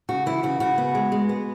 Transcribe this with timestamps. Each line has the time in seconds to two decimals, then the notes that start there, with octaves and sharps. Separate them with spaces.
0.09 C#3 F#4
0.26 E3 E4
0.43 C#3 F#4
0.60 C#3 F#4
0.78 B3
0.95 G#3
1.12 G#3
1.29 B3